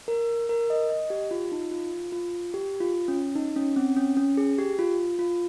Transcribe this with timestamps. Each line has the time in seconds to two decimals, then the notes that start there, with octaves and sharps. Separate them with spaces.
0.08 A#4
0.49 A#4
0.70 D#5
0.90 D#5
1.10 G4
1.31 F4
1.52 D#4
1.71 F4
2.12 F4
2.54 G4
2.80 F4
3.08 C#4
3.35 D#4
3.56 C#4
3.76 C4
3.97 C#4
4.17 C#4
4.37 G#4
4.58 G4
4.79 F4
5.19 F4